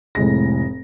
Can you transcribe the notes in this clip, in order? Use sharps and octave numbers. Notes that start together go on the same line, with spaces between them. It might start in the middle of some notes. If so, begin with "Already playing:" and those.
F1 A2 G#3 A#6